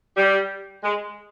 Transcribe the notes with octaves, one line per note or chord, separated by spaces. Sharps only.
G3
G#3